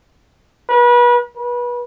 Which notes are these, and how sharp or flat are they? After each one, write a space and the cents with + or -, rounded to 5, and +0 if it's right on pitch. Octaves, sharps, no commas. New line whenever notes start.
B4 -35
B4 -25